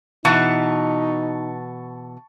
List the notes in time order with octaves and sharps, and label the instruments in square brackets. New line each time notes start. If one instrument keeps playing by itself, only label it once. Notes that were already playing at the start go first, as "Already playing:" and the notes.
[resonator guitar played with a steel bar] B2 E3 [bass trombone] D#4 [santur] A5 C#6